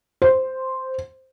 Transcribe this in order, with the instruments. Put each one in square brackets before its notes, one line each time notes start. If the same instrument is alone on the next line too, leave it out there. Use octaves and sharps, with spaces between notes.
[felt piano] C5